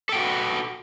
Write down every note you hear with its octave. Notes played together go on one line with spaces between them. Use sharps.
F#4 A4 B4 G5